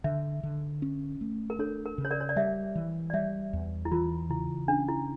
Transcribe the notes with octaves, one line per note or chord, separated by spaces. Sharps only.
D3 C#5 E5
D3
C#4
A3
A#4
D4 A4 C#5
A#4
C#3
C#5
A#4 D5
C#5
D5
G3 C#5 E5
E3
D5
G3 C#5 E5
E2
E4
E3 F4
C#3 E4
C#4 D4
E4